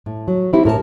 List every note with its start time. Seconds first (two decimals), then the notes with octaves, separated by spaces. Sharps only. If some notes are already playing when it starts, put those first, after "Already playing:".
0.06 A2
0.28 F#3
0.53 C4 E4 G4
0.65 A2 A#4 B4 A5